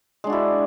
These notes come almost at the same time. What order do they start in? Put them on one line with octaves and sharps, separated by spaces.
G#3 D4 F#4 E4